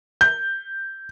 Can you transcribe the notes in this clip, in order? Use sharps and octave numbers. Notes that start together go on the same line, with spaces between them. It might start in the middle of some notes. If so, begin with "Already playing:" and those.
G6